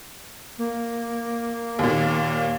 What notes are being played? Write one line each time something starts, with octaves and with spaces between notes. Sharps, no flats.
A#3
D#2 A#2